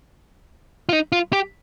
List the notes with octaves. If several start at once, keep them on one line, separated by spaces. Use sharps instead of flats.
F4
D#4
F4
G4